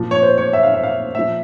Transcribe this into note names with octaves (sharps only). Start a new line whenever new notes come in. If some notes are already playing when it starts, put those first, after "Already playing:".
Already playing: A#2 F3
C#5
C5
C#5
E5
F5
E5
F5
A#2 F3 E5